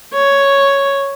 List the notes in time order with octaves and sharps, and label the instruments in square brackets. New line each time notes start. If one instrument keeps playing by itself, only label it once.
[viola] C#5